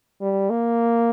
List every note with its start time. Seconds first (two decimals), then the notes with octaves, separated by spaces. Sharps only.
0.21 G3
0.50 A#3